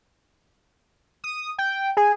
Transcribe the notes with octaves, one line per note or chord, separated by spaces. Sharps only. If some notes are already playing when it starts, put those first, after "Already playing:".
D#6
G5
G#4